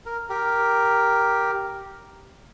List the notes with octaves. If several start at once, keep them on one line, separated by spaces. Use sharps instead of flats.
A#4
G4 A#4